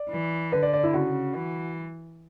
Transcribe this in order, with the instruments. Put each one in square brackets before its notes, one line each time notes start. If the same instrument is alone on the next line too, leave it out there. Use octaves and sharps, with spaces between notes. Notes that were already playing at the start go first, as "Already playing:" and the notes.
Already playing: [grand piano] D5
[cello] E3
[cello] D3 [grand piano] B4
[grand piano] D5
D5
E4
[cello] C#3 [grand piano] F#4
[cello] E3